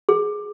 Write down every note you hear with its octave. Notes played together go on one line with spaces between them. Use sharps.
G#4